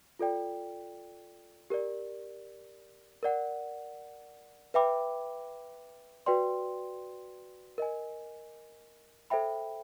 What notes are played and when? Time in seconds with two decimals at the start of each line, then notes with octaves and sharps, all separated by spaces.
0.19 F4 A4 D5 G5
1.70 G4 A#4 D5
3.23 A#4 D5 F#5
4.74 B4 E5 G5 B5 D6
6.26 F#4 B4 D5 G5 C6
7.78 A#4 D#5 G#5
9.30 A4 C5 E5 G5 B5